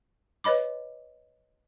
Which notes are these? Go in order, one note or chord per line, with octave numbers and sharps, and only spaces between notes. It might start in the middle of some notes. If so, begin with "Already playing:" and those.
B4 C#5 D#5 B5 D6